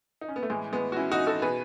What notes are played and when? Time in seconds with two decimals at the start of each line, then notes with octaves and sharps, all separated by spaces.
0.21 D#4
0.28 C#4
0.36 B3
0.43 A3
0.50 A2 E3 G#3
0.73 G#3 B3
0.92 F#4
0.96 C#4 E4
1.12 D#4 F#4
1.27 F#4 A4
1.42 B2 G#4 B4